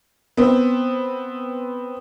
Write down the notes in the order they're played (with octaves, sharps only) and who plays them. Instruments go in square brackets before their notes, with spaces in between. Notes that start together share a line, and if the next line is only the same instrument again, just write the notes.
[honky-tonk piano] B3 C4